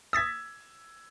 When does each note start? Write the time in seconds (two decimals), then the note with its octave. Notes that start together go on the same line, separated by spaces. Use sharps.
0.13 D#6 E6 G#6 A6 B6